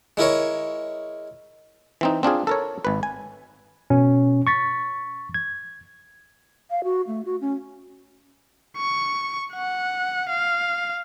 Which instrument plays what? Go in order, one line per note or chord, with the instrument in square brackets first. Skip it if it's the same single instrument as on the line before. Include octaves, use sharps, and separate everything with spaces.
[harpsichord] G#3 E4 A#4 C#5
[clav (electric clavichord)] E3 C4 D#4
C4 D4 F4 G#4
A4 A#4 C#5
G#1 B4
G#5
[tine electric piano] B2 C#4
C#6 A6 B6
G#6
[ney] F5
F#4
A3
F#4
C#4
[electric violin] C#6
F#5
F5